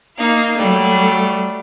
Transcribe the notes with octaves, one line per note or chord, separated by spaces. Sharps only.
A#3 D#4 F5
F#3 G3 A3